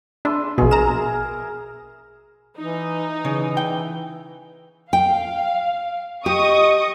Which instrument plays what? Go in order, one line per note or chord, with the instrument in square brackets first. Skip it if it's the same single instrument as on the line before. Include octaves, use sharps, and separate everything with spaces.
[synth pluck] D4 [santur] B4 E5 C6
[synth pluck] A#1 B2 [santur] G#4
[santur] A#4 [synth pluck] A#5 E7
[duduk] E3 [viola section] D#4
[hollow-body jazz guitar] C#3 [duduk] E3
[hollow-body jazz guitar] G5
[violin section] F5 [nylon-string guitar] G5
[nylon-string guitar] G4 [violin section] D#5 C#6 D#6